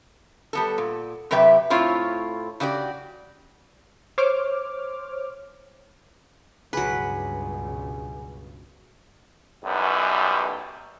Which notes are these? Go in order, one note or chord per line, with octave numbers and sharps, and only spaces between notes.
G3 B3 A4
A#2
C3 F#3 G4 B4 E5 G5
A2 C4 E4 F4 C#5
C#3 F#4 G4 D5
C5 C#5 D6 F6
C#2 G2 B2 F#3 G#4 B4 G#5
B1 F#2 E3 G3